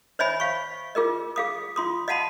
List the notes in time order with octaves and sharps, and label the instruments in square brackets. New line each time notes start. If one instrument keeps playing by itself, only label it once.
[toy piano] C5 C#5 D#5 E5 G#5 B5
F5 C#6
F4 G#4 A#4 D#5
G#4 F5 D#6
F4 C6 D#6
D#5 F5 F#5 A5 B5 C6